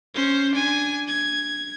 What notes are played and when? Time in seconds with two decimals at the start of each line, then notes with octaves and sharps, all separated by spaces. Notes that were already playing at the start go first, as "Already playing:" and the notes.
0.14 C#4 C5
0.52 D4 G#5
1.08 G#6